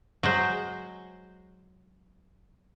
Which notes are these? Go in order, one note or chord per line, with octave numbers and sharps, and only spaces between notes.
F#3 G#3 C5